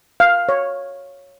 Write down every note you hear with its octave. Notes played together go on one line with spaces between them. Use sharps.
F5
C#5